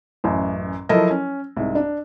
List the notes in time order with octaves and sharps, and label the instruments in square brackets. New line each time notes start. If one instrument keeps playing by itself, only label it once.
[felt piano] A1 F#2
F3 F#3 E4 A4 A#4 D#5
C#4
C2 G#2
D4